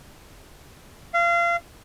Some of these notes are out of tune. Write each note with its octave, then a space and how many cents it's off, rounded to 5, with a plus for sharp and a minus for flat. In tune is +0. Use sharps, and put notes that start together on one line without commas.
F5 -30